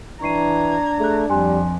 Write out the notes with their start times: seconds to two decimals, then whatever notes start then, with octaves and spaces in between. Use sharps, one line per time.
0.22 E3 D4 A#5 C#6 G#6 C7 D#7
1.00 A3 G#4 F#6
1.30 F2 G3 G#5 C6 F#6